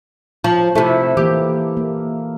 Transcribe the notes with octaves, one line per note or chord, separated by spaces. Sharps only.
F3
C3 A3 E4 A4 E5
E3 A#3 G4
A#3